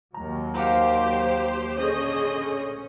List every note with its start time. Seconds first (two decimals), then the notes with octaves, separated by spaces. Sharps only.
0.14 D#2 F#3 A#5
0.55 G4 C5 F5 F#5 A#5
1.77 D3 C#4 G#4 C5 D#5